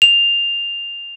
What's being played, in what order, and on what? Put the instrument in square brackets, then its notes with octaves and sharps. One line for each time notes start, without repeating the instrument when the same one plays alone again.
[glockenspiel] F7